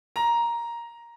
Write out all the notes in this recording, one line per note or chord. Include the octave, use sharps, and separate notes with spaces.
A#5